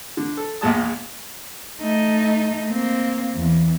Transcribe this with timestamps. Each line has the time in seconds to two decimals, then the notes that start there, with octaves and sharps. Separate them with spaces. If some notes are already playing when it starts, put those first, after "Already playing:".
0.17 D3
0.37 A4
0.61 A#1 E2 A#2 G#3 A5 D#6
1.82 A3 D#4
2.69 A#3 C4
3.35 E2